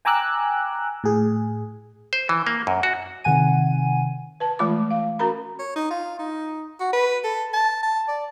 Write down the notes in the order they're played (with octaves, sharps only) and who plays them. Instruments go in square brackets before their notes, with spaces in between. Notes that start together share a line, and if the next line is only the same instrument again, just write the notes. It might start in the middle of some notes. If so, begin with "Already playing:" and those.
[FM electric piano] G5 G#5 A#5 D6 E6 F#6
A2 G#4
[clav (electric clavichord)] C5
E3
A#3
F#2
F#4
[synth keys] C3 D#3 F#5 G#5 D#7
[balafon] B4 A5
E3 G#3 A3 F4 B5 D6
F5
C#4 F#4 A#4 A#5 B5
[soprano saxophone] C#5
D#4
F4
D#4
F#4
B4
A4
A5
A5
D5